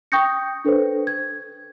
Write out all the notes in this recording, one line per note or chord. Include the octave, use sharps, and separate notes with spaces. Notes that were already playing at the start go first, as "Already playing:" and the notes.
G5 C#6 D#6 G6 A#6 C#7
D4 A4 B4 C5
G#6